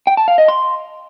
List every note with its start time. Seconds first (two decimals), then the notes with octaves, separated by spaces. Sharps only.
0.07 G5
0.17 A5
0.28 F5
0.38 D#5
0.48 C6